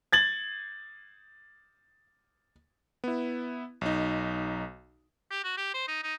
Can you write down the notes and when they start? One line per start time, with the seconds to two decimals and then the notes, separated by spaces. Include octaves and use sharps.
0.13 G#6 A6 F#7
3.04 B3 E4
3.81 B1 D#4
5.31 G4
5.44 F#4
5.57 G4
5.74 C5
5.88 D#4
6.03 D#4